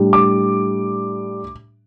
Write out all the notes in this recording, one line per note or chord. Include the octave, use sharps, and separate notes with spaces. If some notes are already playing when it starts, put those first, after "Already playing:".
Already playing: A2 G3 D4
D6